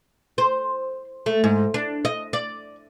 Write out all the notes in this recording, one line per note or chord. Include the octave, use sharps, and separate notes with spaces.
C5
A3
G#2
D4
D#5
D5